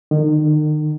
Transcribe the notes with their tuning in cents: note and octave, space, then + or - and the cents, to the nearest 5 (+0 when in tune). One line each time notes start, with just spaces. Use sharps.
D#3 -35